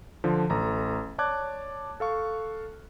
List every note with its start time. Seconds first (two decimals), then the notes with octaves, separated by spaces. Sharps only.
0.24 D3 F3
0.50 A1 A4 A#5
1.18 C#5 D5 A5 D6 F#6 G#6
2.00 A4 F5 C#6